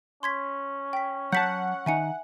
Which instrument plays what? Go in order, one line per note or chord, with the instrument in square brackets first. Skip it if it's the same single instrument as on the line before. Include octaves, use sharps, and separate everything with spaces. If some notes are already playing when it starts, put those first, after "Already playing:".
[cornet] C#4 [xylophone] C6 G#6 B6
[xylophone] G5 B6
[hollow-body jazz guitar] F#3 A5 [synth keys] F#5 [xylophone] G6 B6
[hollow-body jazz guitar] D#3 D#4 [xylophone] E5 G#5 C#7